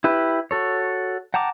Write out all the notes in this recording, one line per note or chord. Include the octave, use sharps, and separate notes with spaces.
E4 G4 B4
F#4 A4 C#5
F#5 G5 A5 A#5 D6